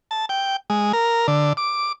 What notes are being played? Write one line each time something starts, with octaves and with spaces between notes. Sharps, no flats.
A5
G5
G#3
A#4
D3
D6